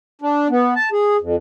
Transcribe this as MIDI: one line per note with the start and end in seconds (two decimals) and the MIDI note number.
0.22 0.48 62
0.50 0.74 59
0.75 0.89 81
0.92 1.17 68
1.21 1.36 41